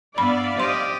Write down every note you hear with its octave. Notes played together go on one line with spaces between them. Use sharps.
G2 B3 D5 E5 F5 B5
G4 C5 D#5 C6